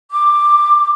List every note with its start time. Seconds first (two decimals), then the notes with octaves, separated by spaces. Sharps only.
0.11 D6